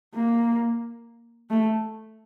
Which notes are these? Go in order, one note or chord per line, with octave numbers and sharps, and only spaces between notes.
A#3
A3